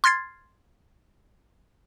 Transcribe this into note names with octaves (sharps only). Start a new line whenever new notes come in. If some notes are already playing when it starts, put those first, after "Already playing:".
C6 F6 G#6 A6 C7